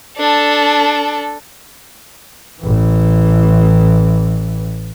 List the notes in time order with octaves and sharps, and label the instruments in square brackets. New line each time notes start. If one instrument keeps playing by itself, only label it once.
[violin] D4 A4
[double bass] A1 E3